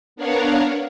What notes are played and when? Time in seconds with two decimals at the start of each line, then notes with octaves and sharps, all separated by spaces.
0.16 B3 D4 A#4 C#5 F5 F#5